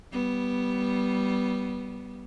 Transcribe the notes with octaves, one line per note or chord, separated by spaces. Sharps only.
G3 B3